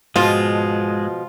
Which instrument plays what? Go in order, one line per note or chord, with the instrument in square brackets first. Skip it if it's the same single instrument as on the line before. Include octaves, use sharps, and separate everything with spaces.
[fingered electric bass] G#2 [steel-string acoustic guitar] B2 F3 [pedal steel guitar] G#3 [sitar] F4